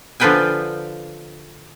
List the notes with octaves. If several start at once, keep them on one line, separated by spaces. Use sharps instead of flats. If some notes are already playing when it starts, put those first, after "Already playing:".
D3 F3 F4 B4 G5 G#5